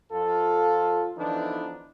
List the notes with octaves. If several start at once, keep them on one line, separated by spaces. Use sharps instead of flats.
F2 F4 A4
D3 E3 F3 B3 D4 D#4